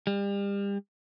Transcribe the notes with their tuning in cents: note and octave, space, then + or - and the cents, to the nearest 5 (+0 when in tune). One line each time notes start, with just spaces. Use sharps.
G3 +35